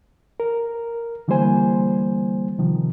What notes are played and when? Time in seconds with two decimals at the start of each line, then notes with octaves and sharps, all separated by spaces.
0.40 A#4
1.28 D3 E3 G3 A#3 C5 G#5
2.59 C3 D#3 F3